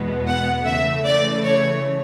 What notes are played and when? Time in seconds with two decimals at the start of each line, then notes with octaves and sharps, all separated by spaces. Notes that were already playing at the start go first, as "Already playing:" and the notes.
Already playing: E2 B2 G#3 B3
0.27 F#5
0.66 C#3 E3 A3 E5
1.06 D5
1.45 C#5